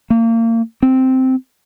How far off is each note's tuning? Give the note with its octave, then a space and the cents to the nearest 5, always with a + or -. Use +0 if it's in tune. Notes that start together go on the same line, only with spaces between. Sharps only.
A#3 -30
C4 -5